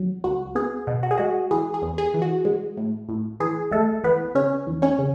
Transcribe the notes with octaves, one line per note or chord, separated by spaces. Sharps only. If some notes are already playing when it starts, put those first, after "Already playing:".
Already playing: F#3
C#2 F#4
B3 G#4
B2
F#4
G#4
G#3 F#4
E3 G#4
G#4
E2
G#4
E3
F#4
G#3
A2
A2
E3 G#4
G#3 A3 A4
E3 B3 B4
C#3 C#4 C#5
E2
C#4 C#5
C#3